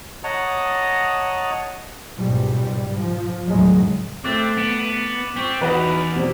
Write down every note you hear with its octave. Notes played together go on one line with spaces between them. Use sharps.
C#5 D#5 F#5 A5 A#5 D#6
C#2 G#2 B2 G3
F3
D#2 A2 C#3 F#3 G#3
A3 C4 D6 F#6 A6
B3 B6 D7 E7
C4 C#6 B6
E2 D#4 F#4 B4
B2 G3 C4